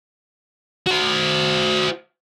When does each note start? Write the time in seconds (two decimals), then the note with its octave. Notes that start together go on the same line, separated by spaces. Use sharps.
0.86 F#4 C5